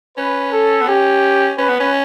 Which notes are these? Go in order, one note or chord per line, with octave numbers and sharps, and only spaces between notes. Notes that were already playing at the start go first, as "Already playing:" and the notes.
C#4 B4
A4
B3
C#4 G4
C#4 B4
B3
C#4